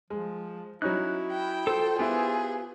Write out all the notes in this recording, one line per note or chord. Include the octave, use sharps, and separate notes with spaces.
F3 G#3
F#3 C#4 D#4 E4 F#6
G5
F4 A4 C5
B3 E4 F4 G4 G#4 B4